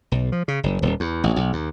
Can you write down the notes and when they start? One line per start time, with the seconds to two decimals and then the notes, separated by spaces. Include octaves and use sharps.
0.12 B1
0.32 F3
0.48 C#3
0.63 F#1
0.82 D#1
1.00 E2
1.24 A1
1.36 B1
1.53 D#2